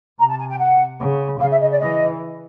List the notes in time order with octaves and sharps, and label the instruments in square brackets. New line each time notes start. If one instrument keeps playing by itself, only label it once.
[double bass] C3 [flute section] A#5
[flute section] A5
G#5
G5
F#5
[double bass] C#3
[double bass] C#3 [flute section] F5
[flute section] E5
D#5
D5
[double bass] E3 [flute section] D#5